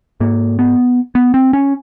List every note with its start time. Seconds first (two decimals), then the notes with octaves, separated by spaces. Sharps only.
0.20 G#2 A#3
0.59 B3
1.15 B3
1.34 C4
1.53 C#4